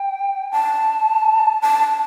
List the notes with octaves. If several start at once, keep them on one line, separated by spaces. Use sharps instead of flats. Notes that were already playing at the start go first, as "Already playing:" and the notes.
Already playing: G5
A5
A5